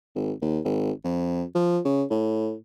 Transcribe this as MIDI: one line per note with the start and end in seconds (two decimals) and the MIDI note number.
0.15 0.32 32
0.42 0.59 39
0.64 0.91 32
1.04 1.43 41
1.55 1.80 53
1.85 2.03 49
2.10 2.55 45